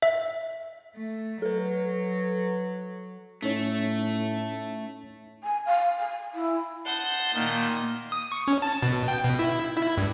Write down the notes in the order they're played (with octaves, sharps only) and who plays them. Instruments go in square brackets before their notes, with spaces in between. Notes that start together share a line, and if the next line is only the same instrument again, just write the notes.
[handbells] E5
[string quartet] A3
[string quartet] F#3 [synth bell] A4 B4
[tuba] A2 [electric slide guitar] A3 [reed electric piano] C#4 D#4 C#5
[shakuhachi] G#5
F5
G#5
E4
[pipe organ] F#5 A5 C6 [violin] D#6 G6
[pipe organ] A#2 D#3 [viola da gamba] A#3
[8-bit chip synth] D#6
C#6
C#4
A5
B2
G5
B2
E4
E4
G2